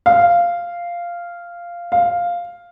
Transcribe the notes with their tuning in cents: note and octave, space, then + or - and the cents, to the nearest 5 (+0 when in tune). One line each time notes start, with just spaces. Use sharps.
F5 -10
F5 +0